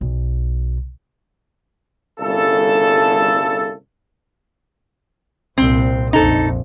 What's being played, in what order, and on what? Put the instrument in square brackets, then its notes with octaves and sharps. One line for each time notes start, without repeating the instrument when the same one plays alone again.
[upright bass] B1
[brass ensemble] G1 C2 C#3 A4
[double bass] C2 A#2 [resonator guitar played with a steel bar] C4
[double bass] A#1 F2 [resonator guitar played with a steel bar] D#4 A4